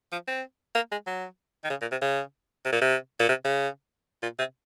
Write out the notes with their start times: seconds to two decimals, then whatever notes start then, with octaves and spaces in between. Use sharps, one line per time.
0.12 F3
0.28 C4
0.75 A#3
0.92 G#3
1.07 F#3
1.64 D#3
1.70 C#3
1.81 A#2
1.92 C3
2.02 C#3
2.65 C3
2.72 A#2
2.81 C3
3.20 A#2
3.29 C3
3.45 C#3
4.22 A#2
4.39 C3